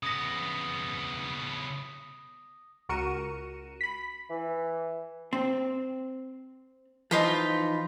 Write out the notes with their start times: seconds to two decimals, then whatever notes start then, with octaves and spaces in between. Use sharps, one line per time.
0.03 C#3 B3 D#6 A#6
2.89 C#2 F#4 A#4 C#7 D#7 E7
3.81 B5 B6
4.30 E3
5.33 C4
7.11 E3 F3 D#4 F4 B5